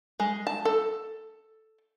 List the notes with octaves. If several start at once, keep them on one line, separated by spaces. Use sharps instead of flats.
G#3
A5
A4